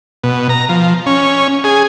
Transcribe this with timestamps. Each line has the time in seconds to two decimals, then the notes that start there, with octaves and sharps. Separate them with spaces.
0.23 B2
0.49 A#5
0.69 F3
1.06 C#4
1.64 G#4